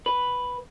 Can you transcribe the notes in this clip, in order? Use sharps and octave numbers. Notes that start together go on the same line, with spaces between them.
B4